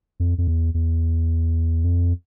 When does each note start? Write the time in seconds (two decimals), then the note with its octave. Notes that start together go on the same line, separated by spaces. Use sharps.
0.20 F2
0.38 F2
0.48 E2
0.74 E2
1.84 F2